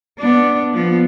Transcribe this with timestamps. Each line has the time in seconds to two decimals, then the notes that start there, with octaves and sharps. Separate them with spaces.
0.18 B3 D4
0.73 F3 B3